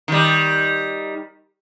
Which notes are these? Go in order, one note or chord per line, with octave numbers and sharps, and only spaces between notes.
D#3 G3